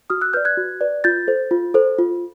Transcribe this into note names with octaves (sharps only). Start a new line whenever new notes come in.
F#4 D#6 F6
E6 F#6
B4 D5 F6 G6
F#6 G#6
F#4
B4 D5
F4 G6 A6
A4 C5
F4
A4 C5
F4